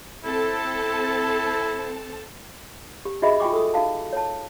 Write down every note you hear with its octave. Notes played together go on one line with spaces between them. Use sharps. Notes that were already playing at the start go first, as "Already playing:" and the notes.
C4 E4 A4 A5
G4
D#4 F#4 G#4 D#5 E5 B5
F4 F#4 G5 G#5 C#6 D6
A4 D#6
D#4 F#4 F5 A5
C#5 A5